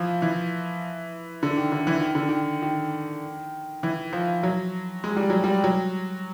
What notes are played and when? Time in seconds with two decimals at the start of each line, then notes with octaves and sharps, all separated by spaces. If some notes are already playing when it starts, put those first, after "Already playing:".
Already playing: E3 F3
0.22 E3
1.43 D3
1.57 D#3
1.72 D3
1.87 E3
2.01 D#3
2.15 D3
2.29 D#3
2.62 D#3
3.83 E3
4.13 F3
4.43 F#3
5.04 G#3
5.17 G3
5.30 F#3
5.44 G3
5.64 F#3